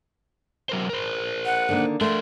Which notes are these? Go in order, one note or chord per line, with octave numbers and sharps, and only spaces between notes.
F#3 A#4 C5
A#4 C5
F#5
D3 D#3 A#3
A3 D4 A#4 C6